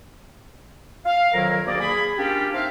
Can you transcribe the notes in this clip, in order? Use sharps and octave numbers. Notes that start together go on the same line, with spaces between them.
F5
F2 D#3 F#3 E4 A#4
D2 A#3 G#4 D5
G#4 B5
A#3 C#4 D4 F4 G4
C4 D#4 E5 F5